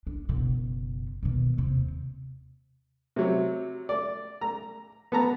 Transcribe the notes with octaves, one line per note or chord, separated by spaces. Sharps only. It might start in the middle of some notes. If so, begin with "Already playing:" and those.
D4
F#1 B2
B2 D#3
D#2 C3
C3 F#3
D5
A#5
B3 A5 A#5